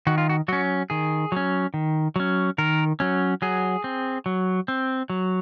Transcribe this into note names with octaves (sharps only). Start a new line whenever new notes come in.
D#3 F#4
F4
F#4
F#3 C#4 F#4
D#3 G#4
F#3 C#4
D#3
F#3 C#4
D#3 A#4
F#3 C#4
F#3 G#4
C4
F#3
C4
F#3